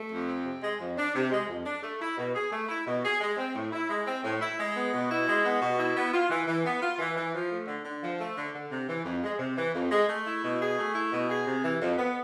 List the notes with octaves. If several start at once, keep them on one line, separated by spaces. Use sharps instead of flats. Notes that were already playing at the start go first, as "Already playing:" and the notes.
Already playing: A3
F2
C4
C3
G#3
F2
D4
C3
G#3
F2
D4
A3
E4
B2
G#4
A3
E4
B2
G#4
G#3
C4
A2
E4
G#3
C4
A2
E4
G#3
B3
B2
E4
G#3
B3
B2
E4
B3
F4
E3
E3
B3
F4
E3
E3
F3
A3
D3
D3
F3
A3
D3
D3
C3
E3
F2
G#3
C3
E3
F2
G#3
A3
E4
B2
G#4
A3
E4
B2
G#4
C3
E3
F2
B3